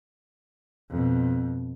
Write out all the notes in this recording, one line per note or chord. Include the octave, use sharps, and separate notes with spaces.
F2 B2